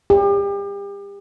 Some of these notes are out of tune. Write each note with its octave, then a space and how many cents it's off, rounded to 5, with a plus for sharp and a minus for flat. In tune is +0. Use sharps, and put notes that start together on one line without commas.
G4 +35